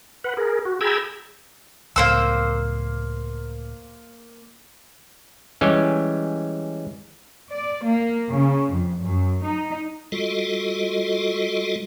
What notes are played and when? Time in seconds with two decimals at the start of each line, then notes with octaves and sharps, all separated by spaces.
0.24 B4 F#5
0.37 G#4 A#4
0.65 F#4
0.81 G#4 G5 A#5 B5 E6 G#6
1.96 C#2 A2 A#3 C5 E6
5.61 E3 G3 G#3 C#4
7.52 D5
7.84 A#3
8.30 C#3
8.73 F2
9.02 F#2
9.44 D#4
10.12 G3 G#3 F4 F#4 A4 D#5